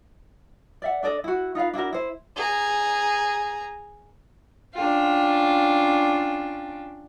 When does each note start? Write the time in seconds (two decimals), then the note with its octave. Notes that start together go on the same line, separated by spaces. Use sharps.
0.82 D5 E5 F#5
1.03 D4 A4 D5 D#5
1.24 E4 F#4
1.55 D#4 F4 B4 F5
1.74 D4 E4 F#4 A#4
1.93 E4 C5
2.36 G#4 A#5
4.75 C#4 D4 F4 G5